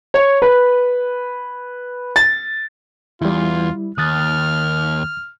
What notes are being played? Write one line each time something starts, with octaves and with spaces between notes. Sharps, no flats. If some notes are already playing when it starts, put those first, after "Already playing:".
C#5
B4
A6
E2 G3 E4 F4
D#2 D#6 F6 F#6 A6